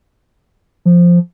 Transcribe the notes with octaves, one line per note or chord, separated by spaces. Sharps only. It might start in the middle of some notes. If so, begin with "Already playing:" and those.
F3